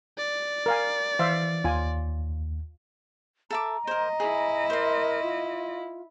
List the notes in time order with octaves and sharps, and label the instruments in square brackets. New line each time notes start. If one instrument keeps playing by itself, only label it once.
[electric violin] D5
[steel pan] A#4 F5 G#5
[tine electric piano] E3 [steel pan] C5 E5 F5
[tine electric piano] D#2 [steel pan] F4 G#5
[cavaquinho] A4 E5 D6 [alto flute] A#5
[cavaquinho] A#4 C5 [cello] D#5
[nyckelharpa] E4 [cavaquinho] G#4
[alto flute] A#4 [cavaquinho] C5 C6
[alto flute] F4